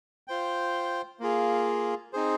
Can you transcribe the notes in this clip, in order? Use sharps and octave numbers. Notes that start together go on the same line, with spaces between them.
F4 C5 G5
A#3 F4 G#4
C4 D#4 G#4 C5